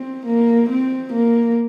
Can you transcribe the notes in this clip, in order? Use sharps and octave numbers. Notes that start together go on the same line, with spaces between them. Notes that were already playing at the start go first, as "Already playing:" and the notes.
Already playing: C4
A#3
C4
A#3